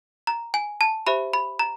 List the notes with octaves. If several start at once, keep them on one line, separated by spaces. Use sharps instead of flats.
A#5
G#5
A5
G4 C5 E5 B5
B5
A#5